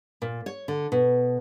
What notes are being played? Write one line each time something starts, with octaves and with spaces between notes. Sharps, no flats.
A#2
C#5
D3
B2